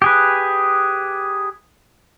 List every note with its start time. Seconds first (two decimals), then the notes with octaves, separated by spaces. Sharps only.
0.02 G4 G#4 B4